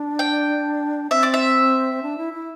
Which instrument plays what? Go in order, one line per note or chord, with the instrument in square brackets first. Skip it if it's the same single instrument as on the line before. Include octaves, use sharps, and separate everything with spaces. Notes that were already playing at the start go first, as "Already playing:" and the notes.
Already playing: [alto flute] D4
[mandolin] G5
[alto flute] C4 [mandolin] E5
[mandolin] D5
E5
[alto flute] D4
E4
E4